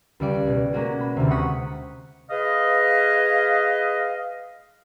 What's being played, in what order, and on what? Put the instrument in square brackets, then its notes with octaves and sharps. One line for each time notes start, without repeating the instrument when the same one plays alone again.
[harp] C#2 G3 D5 D7
B2 G#4
G#3 A#3 C#4 F#4 G#4
B5
D2 C3
F#5 C#6 D#6 B6
[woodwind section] G#4 B4 D#5 F5